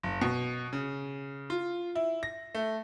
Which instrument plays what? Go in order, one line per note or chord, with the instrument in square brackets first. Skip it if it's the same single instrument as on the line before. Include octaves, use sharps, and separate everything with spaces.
[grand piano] F#1
B2
C#3
F4
E4
A#6
A3